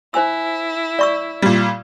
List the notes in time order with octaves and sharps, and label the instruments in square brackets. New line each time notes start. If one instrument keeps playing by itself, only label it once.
[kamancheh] E4 [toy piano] C5 G#5 E6
[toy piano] D5 C#6 E6
[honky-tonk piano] A#2 G3